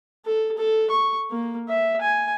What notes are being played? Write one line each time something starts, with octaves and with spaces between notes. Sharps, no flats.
A4
A4
C#6
A#3
E5
G#5